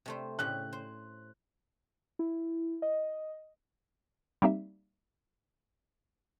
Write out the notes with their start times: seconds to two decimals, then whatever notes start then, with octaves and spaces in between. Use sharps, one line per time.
0.06 C3 A3 C5
0.39 A2 C#3 G4 F#6
0.73 C5
2.19 E4
2.82 D#5
4.42 G3 A#3 C4 D#4 G4 E5